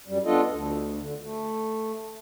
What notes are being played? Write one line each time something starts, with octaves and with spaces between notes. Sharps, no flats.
F#2 G3
B3 D4 F4 A4 D#5
D2
D3
A3